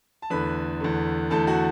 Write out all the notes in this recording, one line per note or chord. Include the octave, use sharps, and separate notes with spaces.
A5
E2 D3 A3 B4 B5
E2 D3 A3
E2 D3 A3 A4 A5
F#4 F#5